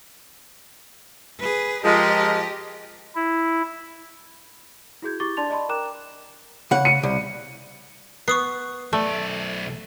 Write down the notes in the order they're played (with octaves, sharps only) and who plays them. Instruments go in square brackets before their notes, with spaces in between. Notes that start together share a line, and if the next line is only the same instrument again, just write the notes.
[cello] G#4 B4
[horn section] F3 G#3 A#4 [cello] G4 D#5
[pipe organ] E4
[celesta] E4 F#4 G#4 G6 G#6
E4 G4 C#6 D6 A6 G7
D4 D5 A5 C6 A6 F7
D5 D#5 A5 B5 C6
A#4 G5 A#5 D6 F#6 E7
[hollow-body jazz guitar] C#3 F#5
[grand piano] C#7 D#7
[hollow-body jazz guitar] C2
[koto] B3 [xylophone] C#6 D#6 C7
[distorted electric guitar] B1 D5 [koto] A3